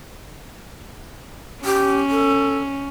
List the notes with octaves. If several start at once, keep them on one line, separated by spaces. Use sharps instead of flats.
C#4 G4
A4